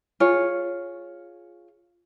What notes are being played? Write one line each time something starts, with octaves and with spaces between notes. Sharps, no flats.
F4 G#4 C#5